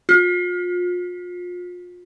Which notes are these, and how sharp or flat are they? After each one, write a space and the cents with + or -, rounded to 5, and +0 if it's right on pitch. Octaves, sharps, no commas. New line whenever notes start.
F4 +35